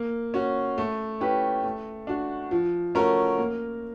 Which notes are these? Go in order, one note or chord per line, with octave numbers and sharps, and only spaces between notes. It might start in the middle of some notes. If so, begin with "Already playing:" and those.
Already playing: A#3
C#4 F#4
A3
C#4 E4 G4 B4
A3
D4 F#4
F3
A3 C#4 F#4 A#4
A#3